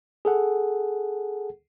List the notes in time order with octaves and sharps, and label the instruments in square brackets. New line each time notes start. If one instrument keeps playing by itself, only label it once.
[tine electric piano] G#4 A4 F#5